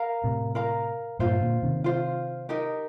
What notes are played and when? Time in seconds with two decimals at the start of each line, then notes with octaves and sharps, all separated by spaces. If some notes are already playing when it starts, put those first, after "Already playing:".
Already playing: A#4 F5 A#5
0.24 A2 C3
0.55 A#4 F5 A#5
1.19 G2 A#2 F4 C5 F5
1.41 A#2 D3
1.63 C3 D#3
1.84 F4 C5 F5
2.49 D#4 G4 A#4 D#5